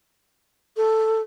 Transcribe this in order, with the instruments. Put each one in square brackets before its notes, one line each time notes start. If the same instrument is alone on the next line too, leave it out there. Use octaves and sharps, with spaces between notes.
[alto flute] A4